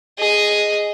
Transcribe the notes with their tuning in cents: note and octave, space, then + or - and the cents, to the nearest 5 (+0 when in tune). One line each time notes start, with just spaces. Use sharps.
G#4 +0 D#5 +0